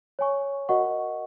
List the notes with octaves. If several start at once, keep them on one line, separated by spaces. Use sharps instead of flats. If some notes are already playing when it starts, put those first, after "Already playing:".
C#5 G#5 C#6
F#4 A#4 D#5 F#5 C#6